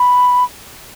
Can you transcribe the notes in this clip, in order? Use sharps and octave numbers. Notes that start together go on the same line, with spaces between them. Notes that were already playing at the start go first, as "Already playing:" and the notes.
Already playing: B5